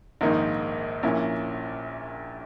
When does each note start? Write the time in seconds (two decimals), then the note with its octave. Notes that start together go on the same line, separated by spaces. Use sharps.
0.21 A#1 G#2 D#3 A#3 D#4
1.03 A#1 A#2 A#3 C#4 E4